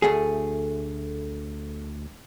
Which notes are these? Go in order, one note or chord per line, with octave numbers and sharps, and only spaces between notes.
D2 A3 G#4